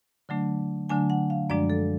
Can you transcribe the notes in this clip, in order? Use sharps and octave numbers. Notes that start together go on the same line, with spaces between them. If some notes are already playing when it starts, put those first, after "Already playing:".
D3 F#3 A3 D4
D3 F#3 A3 D4 G#5
F#5
F5
F#2 F3 G#3 D4 D5
A4